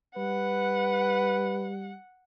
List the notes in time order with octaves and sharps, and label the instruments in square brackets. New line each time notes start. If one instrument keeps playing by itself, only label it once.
[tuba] G3 [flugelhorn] B4 [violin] F#5